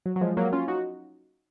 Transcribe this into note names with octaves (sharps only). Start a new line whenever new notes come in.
F#3
F#3
F3 G#3
F#3 A#3
C#4 F4
D#4 F#4